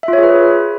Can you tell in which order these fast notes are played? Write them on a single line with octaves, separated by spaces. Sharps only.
E5 F4 C#5 G#4 B4